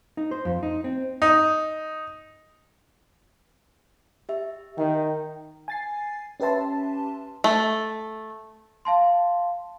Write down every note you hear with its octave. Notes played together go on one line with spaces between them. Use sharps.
D#4
C5
F2
D#4
C4
D#4
G4 E5
D#3 G5
G#5 A6 C7
C#4 G4 B4 E5 A5 C6
A3
F5 A5 C6